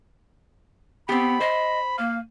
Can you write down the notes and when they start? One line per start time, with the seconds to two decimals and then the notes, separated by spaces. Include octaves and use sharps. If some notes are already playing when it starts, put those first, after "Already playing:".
1.09 B3 C4 G4 B5
1.40 C5 D#5
1.98 A#3 F5